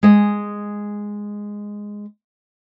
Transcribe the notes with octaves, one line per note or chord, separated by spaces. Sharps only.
G#3 D#5